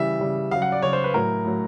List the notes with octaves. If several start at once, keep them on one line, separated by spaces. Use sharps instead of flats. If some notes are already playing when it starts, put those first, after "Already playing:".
Already playing: C#3 E3 G3 E5
C#3 E3 G3
C#3 F#3 F5
F#5
D5
C#3 F#3 C#5
C5
B4
A2 F#3 A#4
A2 F#3